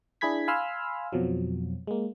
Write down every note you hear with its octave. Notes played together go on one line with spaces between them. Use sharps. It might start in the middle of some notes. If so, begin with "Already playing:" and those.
D4 E4 G#4 B5 G#6 B6
F5 G#5 B5 C6 E6 F6
F2 B2 F3 F#3
G#3 A#3